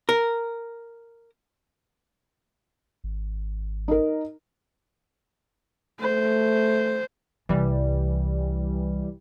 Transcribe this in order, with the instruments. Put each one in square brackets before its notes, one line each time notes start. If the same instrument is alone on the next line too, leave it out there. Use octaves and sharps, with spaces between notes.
[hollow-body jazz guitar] A#4
[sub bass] G#1
[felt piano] D#4 A#4
[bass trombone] A3 [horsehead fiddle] C5
[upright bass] C2 [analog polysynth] E3 G3